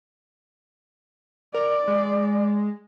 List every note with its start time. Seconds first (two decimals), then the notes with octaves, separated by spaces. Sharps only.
1.54 A#4 D5
1.87 G#3